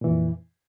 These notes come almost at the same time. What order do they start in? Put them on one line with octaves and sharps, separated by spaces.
A#2 E3 F2